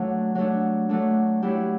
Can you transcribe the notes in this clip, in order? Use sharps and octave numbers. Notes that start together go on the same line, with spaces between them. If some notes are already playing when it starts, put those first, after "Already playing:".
Already playing: F#3 A3 D4
F#3 A3 D4
F#3 A3 D4
F#3 A3 E4 G4